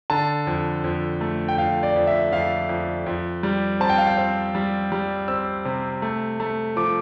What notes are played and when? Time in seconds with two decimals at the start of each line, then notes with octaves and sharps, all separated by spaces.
0.10 D3 A5
0.47 F2
0.84 F2
1.21 A3
1.49 G5
1.57 F2 F5
1.83 D5
1.96 F2
2.07 E5
2.32 F2 F5
2.69 F2
3.06 F2
3.43 G3
3.80 C4 A5
3.90 G5
3.98 F5
4.07 G5
4.18 C4
4.55 G3
4.92 G3
5.28 C4 E6
5.65 C3
6.02 A3
6.40 A3
6.76 F3 D6